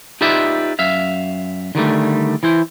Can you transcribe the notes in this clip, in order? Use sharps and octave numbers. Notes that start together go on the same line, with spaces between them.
D#4 F4 G4 B4 D5 E5
F#2 E5 F5
D3 D#3 G3 A3
E3 E4 C5